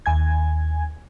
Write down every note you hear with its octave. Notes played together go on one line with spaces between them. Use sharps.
D#2 G#5 G#6